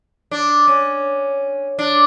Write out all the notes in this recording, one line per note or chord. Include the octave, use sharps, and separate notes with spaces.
D4
C#4
D4